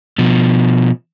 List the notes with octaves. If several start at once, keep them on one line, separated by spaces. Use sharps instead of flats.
B2 F3